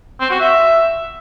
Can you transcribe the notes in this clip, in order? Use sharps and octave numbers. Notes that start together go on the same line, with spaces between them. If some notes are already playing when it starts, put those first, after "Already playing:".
C4
F#4
E5